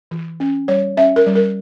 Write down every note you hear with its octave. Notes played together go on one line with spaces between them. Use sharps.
E3
C#4
G3 C#5
C#4 E5
A#4
G3
A#4